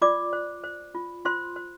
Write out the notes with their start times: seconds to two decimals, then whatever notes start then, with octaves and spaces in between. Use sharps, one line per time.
0.02 F4 D5 D6
0.33 C5
0.64 C5
0.95 F4
1.25 F4 C5 C6
1.56 C5